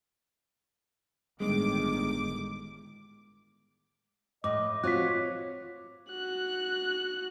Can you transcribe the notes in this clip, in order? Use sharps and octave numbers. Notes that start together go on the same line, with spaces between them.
G1 A2 D#3 G#3 D6
A2 D#5 D6
C4 F4 F#4 C#5 F#6 B6
F#4 F#6